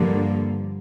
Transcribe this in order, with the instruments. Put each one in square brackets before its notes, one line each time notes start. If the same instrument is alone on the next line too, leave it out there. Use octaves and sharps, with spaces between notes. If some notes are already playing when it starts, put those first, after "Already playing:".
Already playing: [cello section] G2 D3 F3 A#3